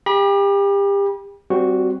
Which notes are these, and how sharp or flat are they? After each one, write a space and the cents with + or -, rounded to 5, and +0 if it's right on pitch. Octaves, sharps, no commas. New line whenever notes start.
G4 +30 B5 -35
G3 -20 C4 +0 F#4 +0